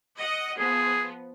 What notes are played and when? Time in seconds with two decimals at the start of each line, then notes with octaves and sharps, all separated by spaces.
0.18 D#5 F#5
0.59 F3 B3 G#4